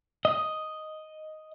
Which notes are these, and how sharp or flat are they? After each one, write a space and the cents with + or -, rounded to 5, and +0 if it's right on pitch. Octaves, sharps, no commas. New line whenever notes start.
D#5 +0